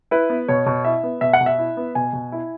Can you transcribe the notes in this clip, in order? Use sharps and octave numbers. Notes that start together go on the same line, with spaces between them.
E4 B4
B3
B2 C#5
B2
E4 E5
B3
B2 E5
F#5
B2
E5
E4
B3
B2 G#5
B2
E4